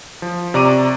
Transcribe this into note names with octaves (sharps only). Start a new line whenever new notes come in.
F3
C3 D5 A#5 C#6 D6 D#7